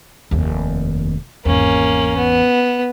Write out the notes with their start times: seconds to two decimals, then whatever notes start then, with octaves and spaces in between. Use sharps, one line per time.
0.31 F1 D#2
1.45 G#1 E2 A#3 C#4
2.17 B3